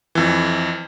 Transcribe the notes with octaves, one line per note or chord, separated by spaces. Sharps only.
F2 E3